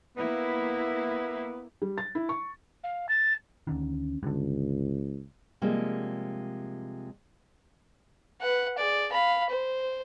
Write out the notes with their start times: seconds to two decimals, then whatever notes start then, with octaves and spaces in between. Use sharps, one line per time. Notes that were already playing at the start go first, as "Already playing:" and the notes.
0.17 A#3 B3 E4
1.82 G3
1.98 A6
2.15 E4
2.29 C#6
2.84 F5
3.09 A6
3.67 D2 D3 D#3 C#4
4.23 C#2 G2 D3
5.62 C3 F3 G3 G#3 A#3
8.41 B4 F#5
8.78 G#4 D5
9.12 F5 B5
9.49 C5